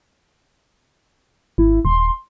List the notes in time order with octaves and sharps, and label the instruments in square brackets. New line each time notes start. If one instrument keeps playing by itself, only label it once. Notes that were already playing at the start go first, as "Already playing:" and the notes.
[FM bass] G#1 [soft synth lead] E4
[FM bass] D#1 [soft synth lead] C6